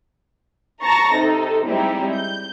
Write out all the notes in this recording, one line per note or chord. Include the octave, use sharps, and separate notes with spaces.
A5 A#5 C#6 A6 A#6
C3 D#4 A4
G3 G#3 C4 D#4 E4 G4
G6